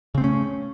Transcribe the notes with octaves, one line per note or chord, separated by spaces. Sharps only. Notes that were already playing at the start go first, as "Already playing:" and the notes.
C#3 A3 C4 C#4